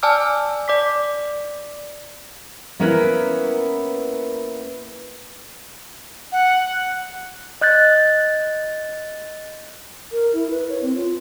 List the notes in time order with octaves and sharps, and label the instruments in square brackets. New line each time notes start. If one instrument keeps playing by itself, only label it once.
[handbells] D5 G#5 A5 D6 E6 F6
D5 D6 B6
[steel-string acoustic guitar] A#3 B3 C#4 E4 A#4 B4
[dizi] F#5
[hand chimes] D#5 F#6 G6 A6
[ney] A#4
E4
B4
C#5
C4
F4